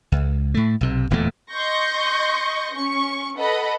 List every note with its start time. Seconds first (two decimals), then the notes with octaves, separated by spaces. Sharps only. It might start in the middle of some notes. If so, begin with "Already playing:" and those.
0.12 C#2
0.54 A2 A3
0.81 B1 C3
1.10 D1 E2 A#2 A3
1.52 D#5 C6 C#6 G6 A#6
2.73 C#4 C#6
3.36 A4 B4 D#5 F#5 B5